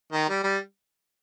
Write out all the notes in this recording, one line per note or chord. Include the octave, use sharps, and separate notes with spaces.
D#3
G3
G3